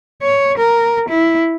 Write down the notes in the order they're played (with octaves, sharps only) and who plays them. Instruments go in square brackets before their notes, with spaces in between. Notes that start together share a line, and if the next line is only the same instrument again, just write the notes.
[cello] C#5
A#4
E4